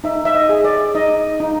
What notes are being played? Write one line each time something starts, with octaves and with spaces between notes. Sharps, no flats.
D#4 E5
E5
D#5
G#4
D5
D#4 D#5
D#4